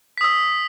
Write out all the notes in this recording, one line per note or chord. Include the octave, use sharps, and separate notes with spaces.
D#6 E6 B6